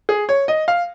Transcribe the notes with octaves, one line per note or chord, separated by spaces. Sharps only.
G#4
C#5
D#5
F5